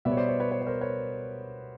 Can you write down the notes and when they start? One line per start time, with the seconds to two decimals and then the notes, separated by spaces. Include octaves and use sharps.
0.05 B2 G3 B3 D5 E5
0.12 C#5
0.17 C5 D5
0.28 B4 C#5
0.40 B4 C#5
0.51 B4 C#5
0.62 C#5
0.67 A#4 C5
0.81 B4 C#5